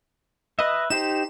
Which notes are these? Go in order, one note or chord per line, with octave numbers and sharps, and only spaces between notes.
B4 D#5 E5
D#4 G4 C5 E7